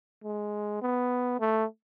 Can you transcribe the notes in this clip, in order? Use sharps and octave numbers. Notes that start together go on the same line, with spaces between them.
G#3
B3
A3